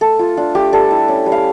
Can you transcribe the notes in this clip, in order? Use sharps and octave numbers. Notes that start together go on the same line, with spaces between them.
A3 A4
F4
D4 F4
A3 G4
G3 A4
E4
C#4
G3
F5